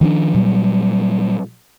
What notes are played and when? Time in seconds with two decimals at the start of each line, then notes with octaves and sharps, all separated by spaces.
0.01 D#3 F3 C#4 D4
0.34 A#2 F#3 G3